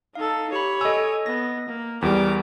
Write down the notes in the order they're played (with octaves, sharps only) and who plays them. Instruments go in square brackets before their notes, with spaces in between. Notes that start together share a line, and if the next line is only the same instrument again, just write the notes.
[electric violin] D#4 A4 [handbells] F5
[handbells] G4 B5 [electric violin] C#5
[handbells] A4 G#5 [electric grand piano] D#5 E6
[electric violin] B3 [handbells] A#6
[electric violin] A#3
[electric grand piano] E2 G3 [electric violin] A#4 D6 [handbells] G#5